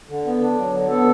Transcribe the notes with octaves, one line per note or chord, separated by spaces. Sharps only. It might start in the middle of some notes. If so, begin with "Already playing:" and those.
D3
B3
D4
F#3
D3
B3 A4